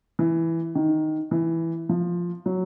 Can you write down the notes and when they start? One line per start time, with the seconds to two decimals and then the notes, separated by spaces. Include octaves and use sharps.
0.19 E3
0.75 D#3
1.31 E3
1.89 F3
2.46 F#3